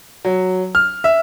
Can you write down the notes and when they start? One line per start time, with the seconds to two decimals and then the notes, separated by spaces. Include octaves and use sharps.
0.25 F#3
0.75 F6
1.04 E5